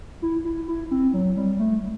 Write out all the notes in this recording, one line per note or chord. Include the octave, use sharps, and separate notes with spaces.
E4
E4
E4
C4
F#3
G3
A3